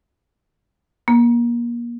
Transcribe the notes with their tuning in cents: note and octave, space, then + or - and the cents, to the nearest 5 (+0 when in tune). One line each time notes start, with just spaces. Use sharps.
A#3 +30